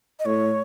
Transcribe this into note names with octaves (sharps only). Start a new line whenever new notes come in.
D#5
A2 C#5